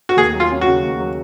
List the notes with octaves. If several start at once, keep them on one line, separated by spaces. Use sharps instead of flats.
F#4
D#2 G#4
F#3
F4
C#4
F#4
C#3
D#2
F#3